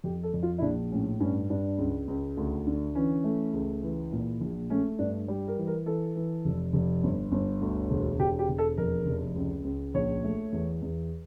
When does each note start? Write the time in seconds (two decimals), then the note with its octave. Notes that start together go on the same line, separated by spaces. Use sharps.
0.04 F2 G4
0.23 A4
0.34 F2
0.43 F4
0.58 E4
0.62 A#1 D4
0.92 A2 C#4
1.20 G2 C#4
1.50 G2 D4
1.78 C#2
2.08 C#2
2.37 D2
2.67 D3
2.95 E3 C#4
3.24 A3
3.53 C#2
3.82 E3
4.12 A#2
4.41 A#1
4.70 A3 C#4
4.99 G2 D4
5.28 G3
5.48 A#4
5.57 E3
5.67 A#4
5.86 E3 A4
6.16 E3
6.45 F1
6.73 F1
7.03 G1
7.32 G1
7.62 D2
7.90 E1
8.19 E1 G4
8.39 G4
8.48 E1
8.58 A4
8.78 F2 A#4
9.06 F1
9.36 C#2
9.65 C#2
9.94 A#1 C#5
10.24 A3
10.52 E2
10.82 E2